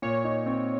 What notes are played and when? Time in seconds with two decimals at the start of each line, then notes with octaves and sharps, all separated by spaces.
0.02 A#2 C#5
0.24 D#4
0.46 C4